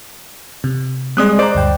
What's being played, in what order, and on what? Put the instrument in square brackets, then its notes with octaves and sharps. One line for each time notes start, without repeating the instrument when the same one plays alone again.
[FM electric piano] C3
[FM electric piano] G3 C4 D5 [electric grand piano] G#3 D#6 F#6
[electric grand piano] C5 D5 D6 [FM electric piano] D#5 A#5
[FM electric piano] D2 G2 G5